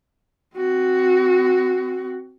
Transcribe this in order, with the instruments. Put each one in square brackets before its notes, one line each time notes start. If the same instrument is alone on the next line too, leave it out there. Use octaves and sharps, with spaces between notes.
[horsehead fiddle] C4 F#4